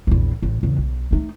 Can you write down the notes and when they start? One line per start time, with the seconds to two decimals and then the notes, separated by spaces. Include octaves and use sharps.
0.07 A#1 E2
0.42 A1
0.63 E2 C#3
0.78 B1
1.11 A3 D#4